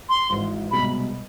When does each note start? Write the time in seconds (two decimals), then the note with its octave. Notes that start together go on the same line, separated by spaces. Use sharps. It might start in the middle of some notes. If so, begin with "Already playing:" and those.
0.09 C6
0.30 G#1 G#2 E3
0.71 C2 B2 G#3 B5